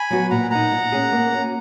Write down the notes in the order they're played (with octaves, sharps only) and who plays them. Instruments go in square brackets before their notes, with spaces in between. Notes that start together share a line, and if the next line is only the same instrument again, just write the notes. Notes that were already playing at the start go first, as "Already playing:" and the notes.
Already playing: [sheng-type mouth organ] G#5 B5
[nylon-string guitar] F#3 B3 F#4
[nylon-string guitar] A#2 [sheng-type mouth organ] F#5 A#5
[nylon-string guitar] A#3 D#4 [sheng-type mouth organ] F#5 A#5
[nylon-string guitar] A#2
A#3 C#4 G#4
A#3
C#4 F#4